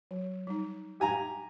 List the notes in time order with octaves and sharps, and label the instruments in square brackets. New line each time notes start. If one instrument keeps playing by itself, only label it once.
[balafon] F#3
G3 D#4
[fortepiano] G4 G#5 A#5